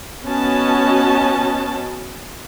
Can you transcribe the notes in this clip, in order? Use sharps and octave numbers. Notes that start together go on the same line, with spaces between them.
B3 C#4 F#4 D#5 A5